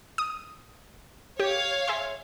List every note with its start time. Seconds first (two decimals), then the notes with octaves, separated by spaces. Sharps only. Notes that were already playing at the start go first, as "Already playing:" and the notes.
0.18 D#6
1.40 G4 C#5 F5
1.87 G#4 E5 C6